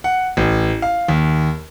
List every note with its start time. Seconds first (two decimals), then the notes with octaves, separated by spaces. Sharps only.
0.04 F#5
0.37 A1
0.82 F5
1.08 D#2